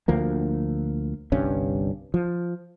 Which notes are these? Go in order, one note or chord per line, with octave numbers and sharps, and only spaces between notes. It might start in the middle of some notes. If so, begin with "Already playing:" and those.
D2 F3 A#3
G1 C2 G2 C#4
F3